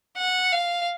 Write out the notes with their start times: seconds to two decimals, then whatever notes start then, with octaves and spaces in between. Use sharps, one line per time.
0.17 F#5
0.52 F5